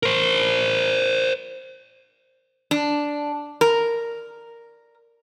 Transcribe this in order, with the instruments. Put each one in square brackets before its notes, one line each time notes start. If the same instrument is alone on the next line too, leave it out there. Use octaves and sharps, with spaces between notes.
[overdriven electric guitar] A#4 C5
[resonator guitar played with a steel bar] D4
A#4